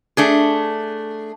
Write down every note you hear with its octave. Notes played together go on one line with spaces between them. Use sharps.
A3 D4 G#4